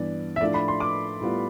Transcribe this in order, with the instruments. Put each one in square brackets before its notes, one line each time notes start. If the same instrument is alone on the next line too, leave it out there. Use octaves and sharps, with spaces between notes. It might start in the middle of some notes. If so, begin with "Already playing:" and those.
Already playing: [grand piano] G2 E3 B3 D4 [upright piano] D5
[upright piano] E5
[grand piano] A2 F3 A3 D4 F4 [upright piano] D5
[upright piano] B5
C6
D6
[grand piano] A2 G3 B3 F4